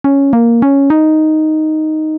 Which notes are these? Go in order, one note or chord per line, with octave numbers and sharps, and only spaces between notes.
C#4
A#3
C#4
D#4